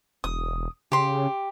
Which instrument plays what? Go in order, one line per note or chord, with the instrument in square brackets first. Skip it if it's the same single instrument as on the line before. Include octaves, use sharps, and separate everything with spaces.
[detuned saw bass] E1 [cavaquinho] D#6
[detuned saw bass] C#3 [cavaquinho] G4 C6